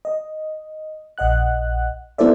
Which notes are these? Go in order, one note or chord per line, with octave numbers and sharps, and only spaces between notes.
D#5
A#1 D#5 F#5 F#6
B3 E4 A4 C5 D5 E5